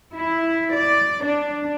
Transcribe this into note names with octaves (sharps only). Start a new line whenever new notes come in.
E4
D5
D4